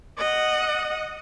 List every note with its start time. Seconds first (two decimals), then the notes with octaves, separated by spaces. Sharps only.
0.18 D#5 F#5